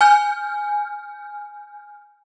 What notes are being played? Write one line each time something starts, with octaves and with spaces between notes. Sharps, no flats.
G#5 F6 G6